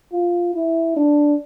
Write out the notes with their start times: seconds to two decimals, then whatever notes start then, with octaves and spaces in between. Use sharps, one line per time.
0.12 F4
0.54 E4
0.96 D4